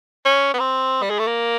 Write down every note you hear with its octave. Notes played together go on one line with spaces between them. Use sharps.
C#4
B3
C4
G3
G#3
A3
A#3